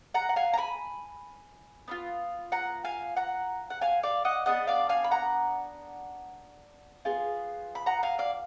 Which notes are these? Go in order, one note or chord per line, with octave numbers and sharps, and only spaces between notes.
F#5 A#5
F#5
F5 G#5
A#5
G#5 B5
B3 D4 F4
F#5 A#5
F5 G#5
F#5 A#5
F#5
F5 G#5
D5 F5
D#5 F#5
B3 D4 G#4 D#5 F#5
D5 F5
F5 G#5
B5
F#5 A#5
B3 F4 G#4
B5
F#5 A#5
F5 G#5
D5 F5